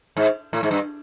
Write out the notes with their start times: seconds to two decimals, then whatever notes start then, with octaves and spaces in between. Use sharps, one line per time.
0.17 G#2
0.53 A2
0.63 G#2
0.71 G2